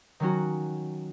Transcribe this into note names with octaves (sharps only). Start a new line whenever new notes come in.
D#3 F#3 C#4 F#4